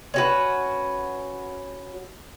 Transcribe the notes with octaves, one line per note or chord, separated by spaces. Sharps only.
C#4 F#4 B4